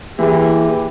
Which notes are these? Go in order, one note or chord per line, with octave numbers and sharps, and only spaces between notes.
E3 A#3 E4 G4 G#4